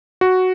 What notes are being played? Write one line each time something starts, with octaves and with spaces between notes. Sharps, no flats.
F#4